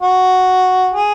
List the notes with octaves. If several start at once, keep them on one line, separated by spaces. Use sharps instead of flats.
F#4
G#4